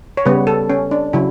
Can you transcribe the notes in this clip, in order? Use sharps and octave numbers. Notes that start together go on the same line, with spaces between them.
C#5
C#3 G3 B3 B4
A4
C#4
D4
C#3 F#3 E4